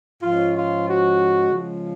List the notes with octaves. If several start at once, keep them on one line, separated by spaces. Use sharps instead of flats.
G#2 F3 G#3 C#4 F4
F4
F#4
C#3 F3 G#3